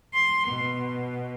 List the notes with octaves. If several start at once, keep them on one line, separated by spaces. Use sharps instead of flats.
C6
B2